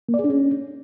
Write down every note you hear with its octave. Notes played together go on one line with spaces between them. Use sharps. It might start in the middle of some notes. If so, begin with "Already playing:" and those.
A#3
D5
G#4
D4
C#4